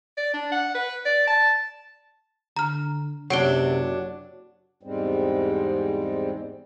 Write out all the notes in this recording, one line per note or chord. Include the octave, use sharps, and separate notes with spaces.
D5
D4
F#5
B4
D5
A5
D3 A#5 F6
F#1 C3 F#3 D4 F#5 D7 G7
E2 G#2 G3 G#3 C4